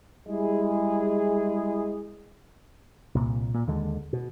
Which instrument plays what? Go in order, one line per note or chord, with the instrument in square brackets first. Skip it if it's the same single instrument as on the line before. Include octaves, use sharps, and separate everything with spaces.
[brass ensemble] G3 G#3 E4 G#4
[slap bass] C2 A#2
A#2
D#2 D3 G#3
B2